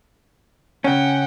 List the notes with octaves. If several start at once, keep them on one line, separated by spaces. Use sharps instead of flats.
C#3 C#4 F#5 G5